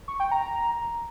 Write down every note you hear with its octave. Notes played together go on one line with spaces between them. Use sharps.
C#6
G5
A#5